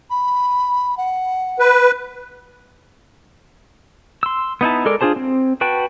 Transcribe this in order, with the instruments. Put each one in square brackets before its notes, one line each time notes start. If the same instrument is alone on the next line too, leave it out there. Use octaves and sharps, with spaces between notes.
[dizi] B5
F#5
[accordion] B4
[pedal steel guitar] C6 E6
B3 D#4 E4 A5
G#3 A4 A#4 D5
D4 F4 G#4 C5 A5
C4
F#4 B4 G5 A5